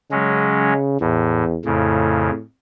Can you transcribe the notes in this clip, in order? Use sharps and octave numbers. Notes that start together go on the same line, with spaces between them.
C#3 F#3 G#3 C#4
E2 A2
F2 A2 C#3